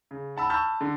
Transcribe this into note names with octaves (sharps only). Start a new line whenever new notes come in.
C#3
F#5 A5 B5 E6
A5 B5 C#6 E6 F6 G6
D3